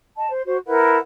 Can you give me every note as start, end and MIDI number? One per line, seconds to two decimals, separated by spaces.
0.16 0.28 75
0.16 0.28 81
0.29 0.42 72
0.45 0.57 66
0.45 0.57 72
0.66 0.97 64
0.66 0.97 70
0.66 0.97 71
0.66 0.97 78